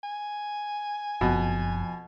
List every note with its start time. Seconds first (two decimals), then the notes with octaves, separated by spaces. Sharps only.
0.04 G#5
1.21 F#1 F2 B2